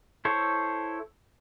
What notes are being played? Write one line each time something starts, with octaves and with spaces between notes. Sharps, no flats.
E4 A4 C5 C#5